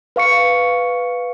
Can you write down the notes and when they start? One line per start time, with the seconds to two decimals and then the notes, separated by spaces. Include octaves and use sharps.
0.16 B4 F5 C#6 C#7